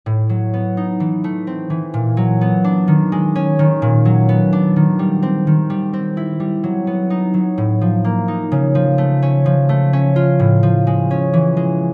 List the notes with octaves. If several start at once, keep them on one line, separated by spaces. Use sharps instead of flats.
A2
F#3
B3
D#4
E3
A3
C4
E3
A#2
F#3
B3
D4
D#3
G#3
C#4
D#3
A#2
F#3
B3
D4
D#3
G3
C4
D#3
G3
C4
E4
G3
F#3
B3
D#4
F#3
A2
F3
A#3
D#4
C#3
F3
A3
C#4
F3
A3
C#4
F4
A2
F3
G#3
C#4
E3
G#3